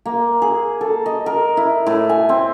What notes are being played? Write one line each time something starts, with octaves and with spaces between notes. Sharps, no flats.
A#3
G#4
A4
D#5
A#4
E4
A2
G#5
C4